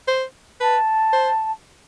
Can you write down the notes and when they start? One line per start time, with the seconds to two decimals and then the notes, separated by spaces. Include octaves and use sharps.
0.08 C5
0.61 B4 A5
1.13 C5